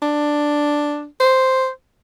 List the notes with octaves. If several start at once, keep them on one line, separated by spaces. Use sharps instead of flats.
D4
C5